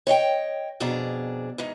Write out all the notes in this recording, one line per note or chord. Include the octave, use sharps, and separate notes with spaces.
C#5 D#5 F5 G5
F2 B2 D4 G#4 D5 A#5
E2 G#2 D#4